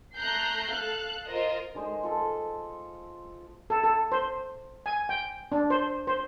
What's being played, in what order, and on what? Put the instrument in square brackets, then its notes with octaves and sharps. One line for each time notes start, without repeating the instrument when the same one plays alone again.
[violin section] A3 A#5 F#6 G6 C7
A4 F5 F#6
F4 A#4 C5 D#5
[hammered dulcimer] D#3 G#3 C5 D#5
F4 A4 A5
[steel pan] A4
A4
C5
G#5
G5
D4
C5
C5